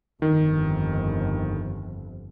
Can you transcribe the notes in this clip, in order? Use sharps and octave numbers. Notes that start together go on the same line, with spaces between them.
G1 F2 D#3